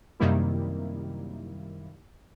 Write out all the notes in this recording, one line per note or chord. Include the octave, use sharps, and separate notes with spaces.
F#2 C3 D#3 G3 A#3 E4